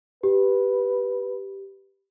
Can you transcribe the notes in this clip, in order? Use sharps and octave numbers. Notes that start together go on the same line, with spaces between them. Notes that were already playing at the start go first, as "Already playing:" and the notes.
G4 B4